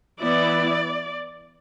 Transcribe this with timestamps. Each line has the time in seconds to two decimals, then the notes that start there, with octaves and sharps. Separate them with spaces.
0.20 E3 B3 E4 D5